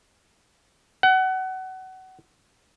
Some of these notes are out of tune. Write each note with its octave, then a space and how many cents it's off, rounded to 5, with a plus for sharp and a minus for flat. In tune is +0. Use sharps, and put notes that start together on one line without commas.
F#5 +25